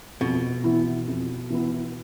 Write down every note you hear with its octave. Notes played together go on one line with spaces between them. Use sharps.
F2 B2
E3 B3 E4
F2
E3 B3 E4